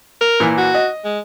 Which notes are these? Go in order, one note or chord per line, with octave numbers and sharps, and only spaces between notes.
A#4
A#2 E3
F#4
D#5
G#3